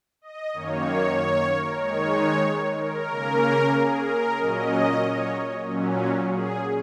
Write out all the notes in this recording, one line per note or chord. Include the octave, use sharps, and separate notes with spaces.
D#5
F#2 D#3 A#3 C#5
C#5
A#4
D#3 G#3 D#4 C#5
A#4
C#3 A#3 C#4
G#4
A#4
A#2 F#3 C#4 D#5
C#5
A#2 F#3 C#4
G#4